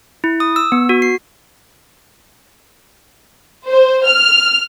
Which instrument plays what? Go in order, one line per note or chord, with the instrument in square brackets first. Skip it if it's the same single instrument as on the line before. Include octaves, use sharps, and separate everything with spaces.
[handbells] E4
D#6
E6
B3
F#4
C7
[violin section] C5
F6